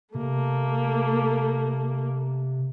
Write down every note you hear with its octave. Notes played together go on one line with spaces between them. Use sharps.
C3 A3 A#3